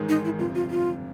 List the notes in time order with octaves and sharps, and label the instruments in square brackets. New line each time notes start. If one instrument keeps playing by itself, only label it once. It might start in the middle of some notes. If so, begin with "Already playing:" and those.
Already playing: [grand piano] A1 G#2 D#3 G#3
[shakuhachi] D#4
E4
[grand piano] G1 F2 C3 [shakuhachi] F4
[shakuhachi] F4
F4